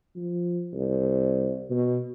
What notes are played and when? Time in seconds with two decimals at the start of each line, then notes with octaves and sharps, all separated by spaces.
0.16 F3
0.74 C2
1.70 B2